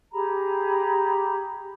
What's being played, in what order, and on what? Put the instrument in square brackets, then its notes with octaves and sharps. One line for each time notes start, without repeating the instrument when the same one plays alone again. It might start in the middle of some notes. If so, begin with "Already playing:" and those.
[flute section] G4 G#4 A#5 B5